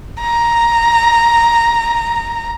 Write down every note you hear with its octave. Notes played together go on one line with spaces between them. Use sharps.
A#5